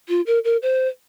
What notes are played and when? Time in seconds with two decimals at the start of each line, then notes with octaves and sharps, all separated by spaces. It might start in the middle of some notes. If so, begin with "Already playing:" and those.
0.09 F4
0.27 A#4
0.44 A#4
0.62 C5